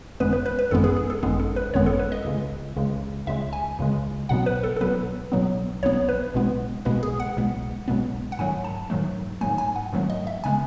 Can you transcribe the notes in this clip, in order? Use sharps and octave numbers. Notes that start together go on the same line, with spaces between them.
G#1 F#2 D#3 G#3 B3 B4
B4
B4
B4
G#1 F#2 D#3 G#3 B3 A4
G#4
G#4
A4
G#1 F#2 D#3 G#3 B3 G#4
A4
B4
G#1 F#2 D#3 G#3 B3 C#5
A4
B4
D#5
C#2 C#3 G#3
C#2 C#3 G#3
C#2 C#3 G#3 E5
G#5
C#2 C#3 G#3
B1 B2 F#3 B3 F#5
B4
A4
A4
B1 B2 F#3 B3 B4
B1 B2 F#3 B3
B1 B2 F#3 B3 C#5
B4
B1 B2 G#3 B3
B1 B2 G#3 B3 B4
G#4
F#5
B1 B2 G#3 B3
B1 B2 G#3 B3
F#5
G#2 D#3 F#3 A3 G#5
A5
G#2 D#3 F#3 A3
G#2 D#3 F#3 A3 G#5
G#5
F#5
G#2 D#3 F#3 A3
D#5
E5
C#3 G#3 B3 G#5